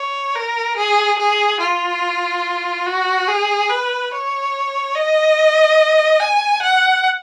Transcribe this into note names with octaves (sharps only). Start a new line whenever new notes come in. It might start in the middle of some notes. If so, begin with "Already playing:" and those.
Already playing: C#5
A#4
G#4
G#4
F4
F#4
G#4
B4
C#5
D#5
G#5
F#5